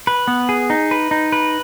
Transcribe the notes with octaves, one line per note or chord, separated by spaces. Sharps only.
B4
B3
G#4
D#4
B4
D#4
B4